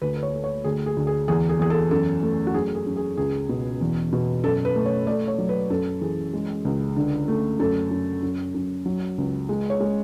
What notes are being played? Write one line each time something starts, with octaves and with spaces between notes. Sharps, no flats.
D2 B4
B4
C#5
A3
C#5
D2 G#4
G#4
D2
G#4
E2 G#4
G#4
E2 G#4
A4
F#2 A4
A3
F#4
F#2 G#4
G#4
F#2
G#4
C#2 G#4
B2
E2
B2
F#2 A4
B4
A3
C#5
A3 D5
C#5
F#3
B4
F#2 A4
E3 G#4
G#3
C#2
D3
A3
F#2 A4
F#2
F#2
F#2
F#3
C#2
G#3
C#5
G#3